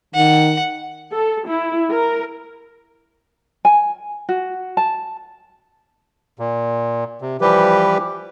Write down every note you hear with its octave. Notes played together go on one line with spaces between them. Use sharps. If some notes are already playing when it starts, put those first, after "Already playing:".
D#3 F#5
A4
E4
A#4
G#5
F#4
A5
A#2
C3
E3 F3 G3 G4 B4